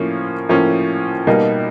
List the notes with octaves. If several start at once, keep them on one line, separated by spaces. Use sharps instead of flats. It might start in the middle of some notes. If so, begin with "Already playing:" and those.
Already playing: A2 F3 A#3 C#4
A2 F3 A#3 C#4
B2 G3 A#3 D#4